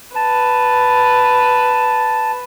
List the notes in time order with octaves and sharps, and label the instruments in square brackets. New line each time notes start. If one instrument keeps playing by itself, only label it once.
[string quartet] B4 [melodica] A5